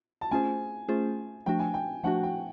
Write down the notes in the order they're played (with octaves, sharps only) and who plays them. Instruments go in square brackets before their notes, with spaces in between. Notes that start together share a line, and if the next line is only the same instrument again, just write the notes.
[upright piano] A5
[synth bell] A3 C#4 F4 G#4 C5 [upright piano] G#5
[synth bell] A3 C#4 F4 G#4 C5
[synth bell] F3 A3 D4 F#4 [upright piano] G5
[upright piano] G#5
G5
[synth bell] F3 A3 D4 F#4 [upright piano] F#5
[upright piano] G5